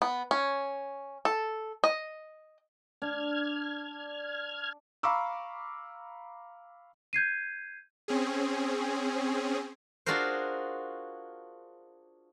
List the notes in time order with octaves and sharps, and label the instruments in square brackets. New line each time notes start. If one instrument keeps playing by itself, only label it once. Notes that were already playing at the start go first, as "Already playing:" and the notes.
[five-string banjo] B3
C#4
A4
D#5
[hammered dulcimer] D4 [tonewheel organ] F6 G#6
[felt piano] F5 A#5 B5 C#6 D6 E6
[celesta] G6 G#6 C7 D#7
[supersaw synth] C4 C#4 G#4
[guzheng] D4 F4 F#4 G#4 A#4 C5